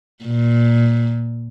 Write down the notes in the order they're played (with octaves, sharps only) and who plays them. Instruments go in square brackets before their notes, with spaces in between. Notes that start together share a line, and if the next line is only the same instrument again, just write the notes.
[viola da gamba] A#2